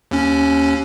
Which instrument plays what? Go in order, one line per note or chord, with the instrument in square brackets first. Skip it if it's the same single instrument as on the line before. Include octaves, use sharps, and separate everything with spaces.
[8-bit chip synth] D#2 C#4